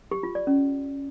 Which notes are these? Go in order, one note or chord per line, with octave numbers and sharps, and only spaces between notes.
G4
F4
D5
C#4